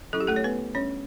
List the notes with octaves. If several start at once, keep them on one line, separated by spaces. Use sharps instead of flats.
F#3 C#4 E4 A4
G4
A3 A4
C#5
B3 B4
G3 C#4 D4 C#5